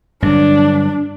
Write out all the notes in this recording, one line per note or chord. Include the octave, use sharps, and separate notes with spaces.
G2 D3 F#3 D4